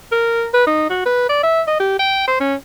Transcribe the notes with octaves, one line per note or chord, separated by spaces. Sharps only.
A#4
B4
D#4
F#4
B4
D5
E5
D#5
G4
G5
C5
C#4